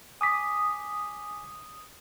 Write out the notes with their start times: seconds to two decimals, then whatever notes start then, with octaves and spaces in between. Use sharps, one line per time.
0.21 G#5 D6 D#6 B6